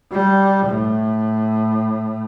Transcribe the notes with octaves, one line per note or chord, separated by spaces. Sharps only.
G3
A2